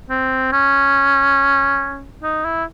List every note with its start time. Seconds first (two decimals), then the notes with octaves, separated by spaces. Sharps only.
0.10 C4
0.52 C#4
2.23 D#4
2.45 E4